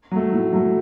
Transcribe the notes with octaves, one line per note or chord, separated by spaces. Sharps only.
F#3 A3
A2
F#3 A3